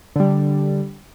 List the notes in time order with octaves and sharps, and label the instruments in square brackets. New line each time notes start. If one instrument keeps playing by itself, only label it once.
[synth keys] D3 G3